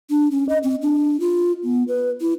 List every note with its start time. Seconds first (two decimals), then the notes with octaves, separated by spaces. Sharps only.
0.10 D4
0.31 C#4
0.49 D#5
0.63 C4
0.82 D4
1.20 F4
1.64 B3
1.88 B4
2.21 E4